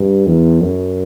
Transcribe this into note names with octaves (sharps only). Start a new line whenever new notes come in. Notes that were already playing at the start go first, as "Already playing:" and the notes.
Already playing: G2
E2
F#2